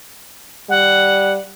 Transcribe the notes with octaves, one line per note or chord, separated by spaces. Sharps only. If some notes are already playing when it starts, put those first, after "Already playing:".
G3 F#5